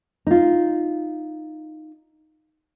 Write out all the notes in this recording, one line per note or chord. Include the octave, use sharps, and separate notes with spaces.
D#4 F4